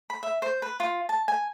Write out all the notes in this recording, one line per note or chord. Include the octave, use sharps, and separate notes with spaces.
B5
E5
C5
B4
F4
A5
G#5